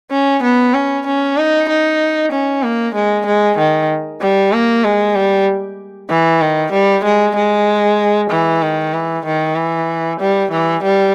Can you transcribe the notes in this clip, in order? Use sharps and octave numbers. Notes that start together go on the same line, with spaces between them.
C#4
B3
C#4
C#4
D#4
D#4
C#4
A#3
G#3
G#3
D#3
G3
A#3
G#3
G3
E3
D#3
G3
G#3
G#3
E3
D#3
E3
D#3
E3
G3
E3
G3